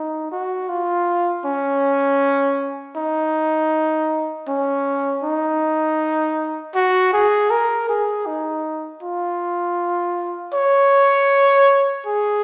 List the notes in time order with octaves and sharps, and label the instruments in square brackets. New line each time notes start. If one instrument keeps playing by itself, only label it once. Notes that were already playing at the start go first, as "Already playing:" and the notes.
Already playing: [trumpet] D#4
F#4
F4
C#4
D#4
C#4
D#4
F#4
G#4
A#4
G#4
D#4
F4
C#5
G#4